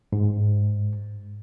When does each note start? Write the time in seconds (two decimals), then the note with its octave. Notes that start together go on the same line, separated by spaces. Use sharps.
0.13 G#2